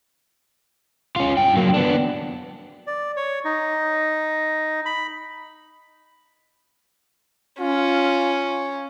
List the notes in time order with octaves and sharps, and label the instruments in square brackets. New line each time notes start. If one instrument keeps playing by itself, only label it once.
[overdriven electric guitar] C#4 F4
G2 G5
F#3 A#3
B3 D4
[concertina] D5
C#5
D#4
B5
[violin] C#4 [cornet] F4